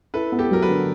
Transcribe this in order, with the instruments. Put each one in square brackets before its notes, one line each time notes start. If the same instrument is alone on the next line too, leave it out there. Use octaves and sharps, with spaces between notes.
[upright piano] E4 [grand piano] A4 B4
[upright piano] B3
[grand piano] G4 A4
[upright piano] F#3 [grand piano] A#4
[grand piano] A4 B4
[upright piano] D3